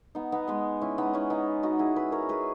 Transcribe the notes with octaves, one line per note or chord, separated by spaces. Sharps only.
B3 D#4
B3 D#4
G#3 B3
C#4 E4
B3 D#4
C#4 E4
B3 D#4
D#4 F#4
E4 G#4
G#4 B4
A#4 C#5
G#4 B4